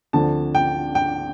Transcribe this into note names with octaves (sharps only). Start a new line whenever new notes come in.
D2 D3 F3 C4 A5
G5
G5